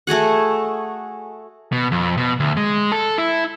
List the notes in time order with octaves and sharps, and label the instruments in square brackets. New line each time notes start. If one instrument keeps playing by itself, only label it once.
[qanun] A3 F#4 G#4 F#5
[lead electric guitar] B2
F2
B2
D2
G#3
A4
E4